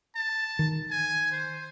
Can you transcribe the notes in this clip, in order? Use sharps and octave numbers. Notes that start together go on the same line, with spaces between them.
A5
D#3
G#5
C5